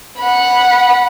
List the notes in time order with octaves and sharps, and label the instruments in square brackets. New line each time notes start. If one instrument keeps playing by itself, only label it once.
[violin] F#5 B5